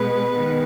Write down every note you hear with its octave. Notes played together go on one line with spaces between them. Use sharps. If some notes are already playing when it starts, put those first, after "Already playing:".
Already playing: B2 G#3 B3 B4
D#3 G#3 B3